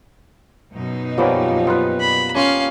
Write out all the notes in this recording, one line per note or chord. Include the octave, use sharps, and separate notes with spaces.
F#2 B2 D#4
F3 G3 A#3 B3 C#4 D5
B3 F4 B4
B5
A#3 C#4 F4 F5